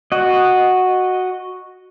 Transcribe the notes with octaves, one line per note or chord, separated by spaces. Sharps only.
F#4 D#5